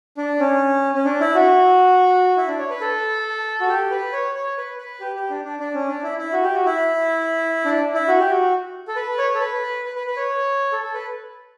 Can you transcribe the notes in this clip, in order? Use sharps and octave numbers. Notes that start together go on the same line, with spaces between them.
D4
C#4
C#4
D4
E4
F#4
E4
D4
C#5
B4
A4
F#4
G4
B4
C#5
C#5
B4
B4
G4
G4
D4
D4
D4
C#4
D4
E4
E4
F#4
G4
F#4
E4
D4
E4
F#4
G4
F#4
A4
B4
C#5
A4
B4
B4
B4
B4
C#5
A4
A4
B4